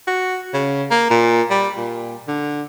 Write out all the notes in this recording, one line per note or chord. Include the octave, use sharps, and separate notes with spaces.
F#4
C#3
A#3
A#2
G3
A#2
D3